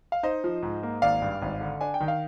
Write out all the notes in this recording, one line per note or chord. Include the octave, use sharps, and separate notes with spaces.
F5
D#4 C5 D#5
F3
G#2
A#3
G#1 D5 F5
G2
G#1
D3
D4 G#5
G5
D#3
F5